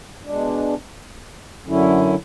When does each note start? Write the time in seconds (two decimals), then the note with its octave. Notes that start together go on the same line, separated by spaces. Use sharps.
0.25 B2 G#3 D4
1.65 F#2 D3 F#3 C#4 E4